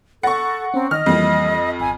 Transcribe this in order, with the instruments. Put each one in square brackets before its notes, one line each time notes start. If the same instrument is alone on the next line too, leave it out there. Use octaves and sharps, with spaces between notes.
[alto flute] A4 [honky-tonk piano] F#5 C#6 [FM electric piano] B5 A6 A#6
[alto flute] C4 [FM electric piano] C#4 A#5
[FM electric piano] D#3 [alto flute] D#5 [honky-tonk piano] F6
[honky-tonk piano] F2 [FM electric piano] E3 G3 A#3
[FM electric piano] G#1 [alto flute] G#5